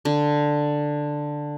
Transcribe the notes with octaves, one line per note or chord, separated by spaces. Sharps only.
D3